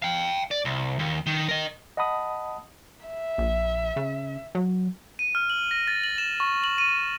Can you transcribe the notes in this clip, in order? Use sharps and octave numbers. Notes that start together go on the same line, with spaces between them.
F5 G5
D5
C2
D#2
D#3
A#4 D#5
D#5 F#5 A5 B5 D#6
E5
A#1
C#3
F#3
D#7
F6
F#7
A#6
A6
F#7
E7
C#6
F#7
D#7